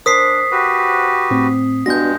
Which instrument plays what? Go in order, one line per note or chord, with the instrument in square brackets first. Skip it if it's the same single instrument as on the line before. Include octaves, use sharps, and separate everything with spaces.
[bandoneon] D4 [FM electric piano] A#4 C5 [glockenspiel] D#6 B6 C7
[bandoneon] F#4 G4 B4
[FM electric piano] A2 C4
[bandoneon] G2 G#3 [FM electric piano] B3 D4 F#4 [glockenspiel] G6 A#6